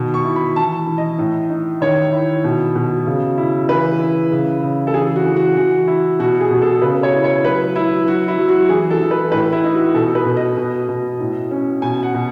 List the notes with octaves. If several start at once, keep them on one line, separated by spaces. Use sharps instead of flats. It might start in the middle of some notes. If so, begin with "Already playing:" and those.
Already playing: B2 D#3
C#6
E4
B5
E3 A5
E3
D#5
A2
D#4
D#3 C#5
E4
B2
B2
C#3
E4
E3 B4
E4
C#3
C#3
A4
E3 G#4
F#4
E3
F#4
E3 F#4
E4
B2 F#4
G#4
B2 G#4
A4
C#3 B4
C#5
E4
C#5
F#3 B4
F#3 E4
F#3 F#4
E4
F#3
F#4
E3 G#4
A4
E3
B4
A2 B4
E4
D#4
F#4
B2 A4
B4
B2
D#5
B2
B2
A2
C#4
B2 G#5
F#5
B2